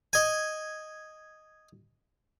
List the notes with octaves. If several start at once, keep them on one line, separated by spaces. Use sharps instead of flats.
D#5 G#5